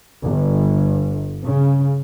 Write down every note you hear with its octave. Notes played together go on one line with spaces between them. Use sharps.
G1
C#3